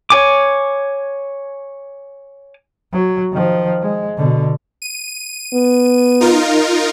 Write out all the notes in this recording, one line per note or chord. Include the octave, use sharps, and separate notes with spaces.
C#5 G#5 D6
F#3
D#3 F3
G#3
B2 D3
D#7
B3
D#4 F4 A#4